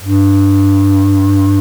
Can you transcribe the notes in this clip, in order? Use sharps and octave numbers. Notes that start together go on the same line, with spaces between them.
G2